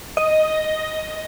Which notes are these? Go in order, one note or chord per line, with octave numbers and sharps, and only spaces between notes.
D#5